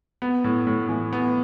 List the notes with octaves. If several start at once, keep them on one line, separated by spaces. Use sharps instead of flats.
B3
A2
A2
E3
B3